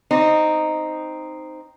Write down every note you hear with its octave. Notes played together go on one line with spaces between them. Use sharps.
C4 D#4